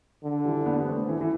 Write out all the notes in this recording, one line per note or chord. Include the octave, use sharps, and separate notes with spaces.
D3
E3 G3
B3 D4
G3 B3
A3 C4
E3
E3